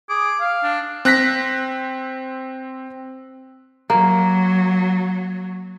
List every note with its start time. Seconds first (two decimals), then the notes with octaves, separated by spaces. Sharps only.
0.10 G#4 D6
0.41 F5
0.63 D4
1.05 C4 F#6 A#6 B6
3.90 F#3 A#3